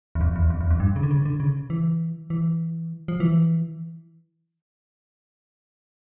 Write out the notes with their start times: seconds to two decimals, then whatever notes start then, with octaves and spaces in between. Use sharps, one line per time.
0.15 E2
0.21 F2
0.36 E2
0.50 F2
0.61 E2
0.71 F2
0.80 G2
0.96 C#3
1.03 D3
1.11 C#3
1.26 D3
1.40 C#3
1.70 E3
2.30 E3
3.08 F3
3.20 E3